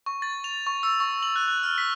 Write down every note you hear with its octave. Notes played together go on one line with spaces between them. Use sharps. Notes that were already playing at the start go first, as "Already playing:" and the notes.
C#6
A6
F7
C#6
E6
C#6
F#7
F#6
F#6
F6
B6